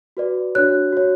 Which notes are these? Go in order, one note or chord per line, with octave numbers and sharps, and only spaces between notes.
F#4 B4 D5
D4 F#4 C#5 F#6
F#4 C#5